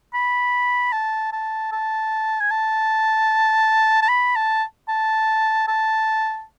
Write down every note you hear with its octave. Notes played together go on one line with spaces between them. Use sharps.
B5
A5
A5
A5
G#5
A5
A5
B5
A5
A5
A5